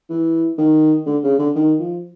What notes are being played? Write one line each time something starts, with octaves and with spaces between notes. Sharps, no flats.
E3
D#3
D3
C#3
D3
D#3
F3